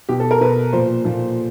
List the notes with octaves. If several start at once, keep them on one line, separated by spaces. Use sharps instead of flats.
B2 G4
A4
A#4
B2 B4
A#2 F3 C5
A#2 F3